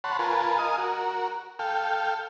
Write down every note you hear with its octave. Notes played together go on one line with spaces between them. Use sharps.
C#5 F#5 A5 B5 C6
F4 A#4 B4 G#5 A5
A#4 D#5 F5 G#5 D#6
F#4 A#4
A4 F5 G5